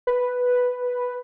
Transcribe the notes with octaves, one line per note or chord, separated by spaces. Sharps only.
B4